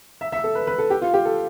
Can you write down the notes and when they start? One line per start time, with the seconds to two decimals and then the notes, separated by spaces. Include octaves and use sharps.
0.21 E5
0.32 E5
0.44 A4
0.55 B4
0.67 B4
0.79 A4
0.90 G4
1.02 F4
1.14 G4
1.25 A4